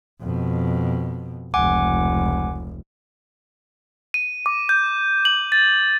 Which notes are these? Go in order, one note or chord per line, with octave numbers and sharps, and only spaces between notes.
F2 B2
F1 C#2 F#5 G#5 D6
D#7
D6
G6
F#7
A6